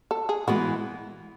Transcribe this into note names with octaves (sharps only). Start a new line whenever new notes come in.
A4
G#4
E3 G#3 B3 F#4